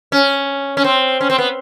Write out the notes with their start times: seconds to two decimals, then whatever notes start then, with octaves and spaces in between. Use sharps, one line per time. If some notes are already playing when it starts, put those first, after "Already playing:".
0.12 C#4
0.77 C#4
0.84 C4
1.21 C#4
1.30 C4
1.38 B3